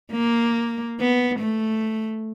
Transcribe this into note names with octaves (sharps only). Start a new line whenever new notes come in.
A#3
B3
A3